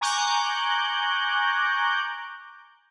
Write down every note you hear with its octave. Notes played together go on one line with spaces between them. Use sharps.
G#5 A#5 C#6 D6 F#6 G6